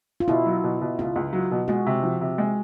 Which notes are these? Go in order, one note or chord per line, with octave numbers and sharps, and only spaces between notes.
F4
B2 E4
F#3
B2
B2
C#2 F4
C#2
F#3
B2
G#3 F#4
C3
F3
C3
G#3